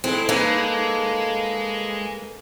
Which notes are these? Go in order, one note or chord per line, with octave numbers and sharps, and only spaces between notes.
G#3 A3 C4 E4
G2 G#3 A#3 A4 B4